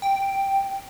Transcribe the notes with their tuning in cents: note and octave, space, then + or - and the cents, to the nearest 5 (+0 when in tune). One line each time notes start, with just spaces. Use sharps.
G5 +0